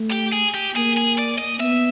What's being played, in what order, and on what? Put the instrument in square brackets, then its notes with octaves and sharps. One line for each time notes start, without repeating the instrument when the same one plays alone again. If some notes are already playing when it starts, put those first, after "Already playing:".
Already playing: [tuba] A3
[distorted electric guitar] G4
G#4
G4
[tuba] A#3 [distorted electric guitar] G#4
[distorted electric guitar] G#4
D5
D#5
[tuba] B3 [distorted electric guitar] E5